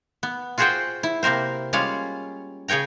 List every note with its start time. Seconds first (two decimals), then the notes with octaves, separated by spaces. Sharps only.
0.23 B3
0.58 F4 F#4 G#4 C5 F#5 G5
1.03 E4
1.23 C3 A#3 C4 A#4 C5
1.73 G3 G#3 C#4 F4 F5
2.68 C#3 G#4 C#5 G5 A#5